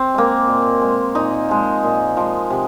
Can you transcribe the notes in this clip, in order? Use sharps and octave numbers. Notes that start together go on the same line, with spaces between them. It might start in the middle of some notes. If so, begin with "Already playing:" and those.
Already playing: C4
G#3 A#3
A#2
G#3
A#2 D#4
F3 G#3
A#2
F3 G#3
C3